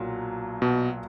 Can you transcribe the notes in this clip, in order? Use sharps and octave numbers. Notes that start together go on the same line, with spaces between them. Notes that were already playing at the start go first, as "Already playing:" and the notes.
Already playing: B1 A#2 F#3
B2